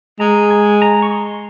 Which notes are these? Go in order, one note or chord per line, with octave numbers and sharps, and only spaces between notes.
G#3 A#5
G#5
A#5
C#6
C6